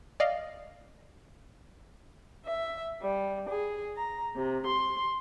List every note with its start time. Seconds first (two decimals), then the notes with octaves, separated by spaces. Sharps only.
0.20 D5 D#5 F5
2.44 E5
3.02 G3
3.47 G#4
3.94 A#5
4.36 C3
4.66 C6